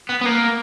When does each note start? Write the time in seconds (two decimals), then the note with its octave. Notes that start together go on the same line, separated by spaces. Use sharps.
0.09 B3
0.22 B3
0.26 A#3